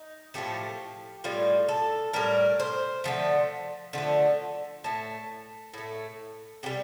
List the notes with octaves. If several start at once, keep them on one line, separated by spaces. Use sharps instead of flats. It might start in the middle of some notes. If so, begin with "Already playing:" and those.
Already playing: D#4
A2 F3 A3 G4
A2 G3 F4
A4
A2 G3 A#4
C5
D3 F3 A3
D3 F3 A3
A2 A3 A5
A2 A3
C3 G3 G5